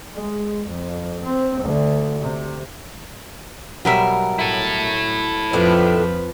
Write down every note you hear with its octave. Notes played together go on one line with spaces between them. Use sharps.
G#3
F2
C4
D2
C3
B2 F#3 G3 A#4 E5
E4 A4
F2 A2 F3 A3 D4 B4